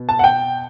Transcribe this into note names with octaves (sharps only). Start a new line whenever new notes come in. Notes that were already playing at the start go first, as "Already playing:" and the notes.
Already playing: B2
A5
F#5
G5